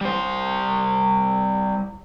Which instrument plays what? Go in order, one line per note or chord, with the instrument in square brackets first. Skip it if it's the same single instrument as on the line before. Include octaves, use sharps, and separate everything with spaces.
[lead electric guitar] G3 C5